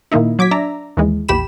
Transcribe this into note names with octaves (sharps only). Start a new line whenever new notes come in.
A#2 D#3 A#3 D#4 E4
F#3 D6 G#6 B6
D4 D5 E5 A#5
D#2 E3 G#3
A#1 E2 G4 B5 E7